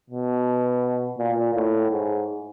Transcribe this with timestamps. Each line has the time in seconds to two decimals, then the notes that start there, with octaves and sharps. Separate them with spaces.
0.10 B2
1.18 A#2
1.55 A2
1.91 G#2